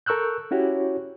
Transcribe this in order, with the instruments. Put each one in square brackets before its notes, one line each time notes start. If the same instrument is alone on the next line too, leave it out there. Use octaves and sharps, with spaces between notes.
[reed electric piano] A4 A#4 C#6 E6 F#6 G6
C#4 E4 F#4 G4 C#5